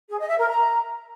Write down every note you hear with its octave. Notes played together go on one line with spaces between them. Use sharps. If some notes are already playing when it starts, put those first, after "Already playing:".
G#4
D#5
E5
A#4
A#5